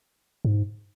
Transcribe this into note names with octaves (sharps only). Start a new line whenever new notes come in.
G#2